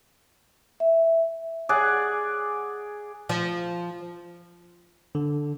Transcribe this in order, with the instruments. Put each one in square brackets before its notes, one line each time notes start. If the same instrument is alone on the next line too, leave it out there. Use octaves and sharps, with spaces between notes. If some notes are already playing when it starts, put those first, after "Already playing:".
[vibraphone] E5
[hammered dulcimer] G#4 D5 F#5
[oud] F3
[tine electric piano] D3